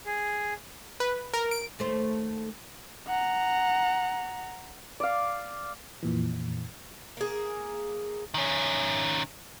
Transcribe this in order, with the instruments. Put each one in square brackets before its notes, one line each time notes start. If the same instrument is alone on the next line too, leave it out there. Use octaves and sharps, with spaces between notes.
[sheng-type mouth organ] G#4
[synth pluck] B4
A#4
D7
[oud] D#2 A3 C5
[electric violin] F#5 A#5
[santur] D5 F5
[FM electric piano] F2 A#2 E3
[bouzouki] A#3 G#4
[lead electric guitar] D#3 C#4